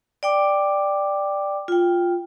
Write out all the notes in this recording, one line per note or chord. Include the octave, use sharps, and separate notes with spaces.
D5 G5 D6
F4 G5